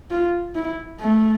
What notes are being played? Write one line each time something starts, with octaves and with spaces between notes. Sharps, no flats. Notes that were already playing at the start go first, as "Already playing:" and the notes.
F4
E4
A3